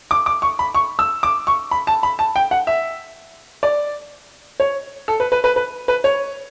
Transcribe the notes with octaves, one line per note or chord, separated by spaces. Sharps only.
D6
D6
C#6
B5
C#6
E6
D6
C#6
B5
A5
B5
A5
G5
F#5
E5
D5
C#5
A4
B4
B4
B4
B4
B4
C#5